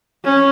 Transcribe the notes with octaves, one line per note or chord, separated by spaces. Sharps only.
C#4